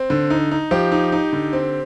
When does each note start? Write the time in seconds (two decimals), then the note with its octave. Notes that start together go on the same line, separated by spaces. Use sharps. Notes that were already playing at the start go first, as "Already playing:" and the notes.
Already playing: C4
0.10 D3
0.30 D#4
0.51 D#4
0.71 F3 G4
0.92 D#4
1.12 D#4
1.33 D3
1.53 C4